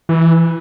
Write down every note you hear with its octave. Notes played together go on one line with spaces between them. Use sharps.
E3